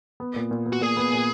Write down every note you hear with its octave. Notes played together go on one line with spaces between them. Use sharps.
B3
A#2
A#2
B3
F#4
A#2 G#4
B3
A#2